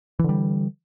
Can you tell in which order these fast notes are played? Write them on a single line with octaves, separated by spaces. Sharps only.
E3 D3 G3